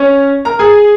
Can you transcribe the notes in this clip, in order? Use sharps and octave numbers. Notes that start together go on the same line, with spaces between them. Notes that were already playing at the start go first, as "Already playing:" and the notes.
Already playing: C#4 C#5
A#4 A#5
G#4 G#5